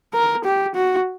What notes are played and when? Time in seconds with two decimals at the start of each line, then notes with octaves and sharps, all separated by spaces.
0.14 A#4
0.45 G4
0.76 F#4